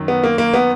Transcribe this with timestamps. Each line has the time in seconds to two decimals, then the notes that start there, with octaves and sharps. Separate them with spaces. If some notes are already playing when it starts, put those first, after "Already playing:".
Already playing: F#2 D#3
0.08 B3
0.24 A#3
0.38 A#3
0.54 B3